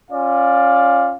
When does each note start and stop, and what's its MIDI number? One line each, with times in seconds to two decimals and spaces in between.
0.11 1.16 61
0.11 1.16 65
0.11 1.16 74
0.11 1.16 77